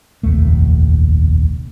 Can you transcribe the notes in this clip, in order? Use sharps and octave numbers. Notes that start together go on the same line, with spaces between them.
F1 A#1 D#2 A3